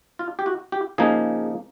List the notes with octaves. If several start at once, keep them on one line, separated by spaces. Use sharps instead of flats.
F4
G4
F#4
G4
C#3 F3 A#3 D#4 G#4